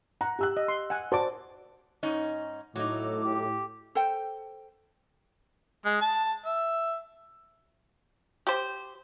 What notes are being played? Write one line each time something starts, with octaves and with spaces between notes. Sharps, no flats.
F#5 A#5
G4 E6 F#6
D#5
C6
F#5 G#5
F#4 C5 D5 A5 D6
G#2 C#4 D#4
A2 F#3 D#4 A4 D6
G4
A4 C5 G5
G#3
A5
E5
G4 C5